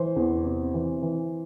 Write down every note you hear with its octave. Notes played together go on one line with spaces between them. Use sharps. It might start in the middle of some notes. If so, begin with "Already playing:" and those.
Already playing: E3 C5
E2
C3
E3
E3